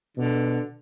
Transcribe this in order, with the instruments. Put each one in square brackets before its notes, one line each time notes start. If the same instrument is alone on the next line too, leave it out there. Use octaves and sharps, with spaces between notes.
[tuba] B2 [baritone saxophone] D3